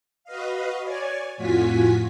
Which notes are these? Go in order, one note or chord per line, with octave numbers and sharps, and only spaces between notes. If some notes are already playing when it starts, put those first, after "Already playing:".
F#4 B4 D#5 F5
C#5 D5 G#5
F2 A2 F4 F#4 G#5 B6